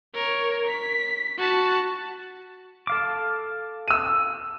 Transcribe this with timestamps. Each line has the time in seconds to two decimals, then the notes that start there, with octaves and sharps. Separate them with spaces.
0.15 A#4 C#5
0.67 B6
1.38 F#4 A5
2.87 A4 F5 D6
3.88 E6 D#7